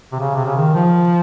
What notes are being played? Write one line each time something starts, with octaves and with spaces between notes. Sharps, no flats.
C3
C#3
C3
C#3
D#3
F3